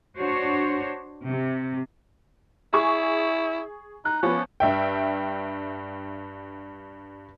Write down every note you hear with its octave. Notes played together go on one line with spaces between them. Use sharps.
D4 F#4 C5 C#5
C3
E4 G#4 G#5 C#6
D#4 F#6
F3 B3 C#4
G2 E5 G5